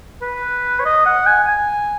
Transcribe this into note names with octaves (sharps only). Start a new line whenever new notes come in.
B4
C#5
D#5
F#5
G#5
G#5